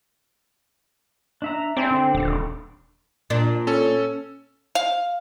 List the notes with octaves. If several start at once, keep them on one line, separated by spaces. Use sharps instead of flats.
D4 E5 A#5
C4 E4 G#4 D5
D3 D5
D#1
A#2 D4
C#4 A4
F5